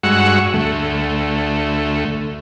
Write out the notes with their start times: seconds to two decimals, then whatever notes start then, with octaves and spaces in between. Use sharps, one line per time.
0.03 G2 G#3 F#4 F#5 C#6 E6
0.54 D2 A3